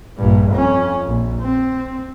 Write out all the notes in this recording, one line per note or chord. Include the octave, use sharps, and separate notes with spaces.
A#1 G2
F2 C#4
A#1
C4